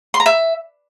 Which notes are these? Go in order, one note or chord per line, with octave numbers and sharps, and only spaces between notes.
C6
A#5
E5